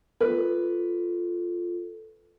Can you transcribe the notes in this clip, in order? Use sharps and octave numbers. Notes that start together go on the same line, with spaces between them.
F4 A4 B4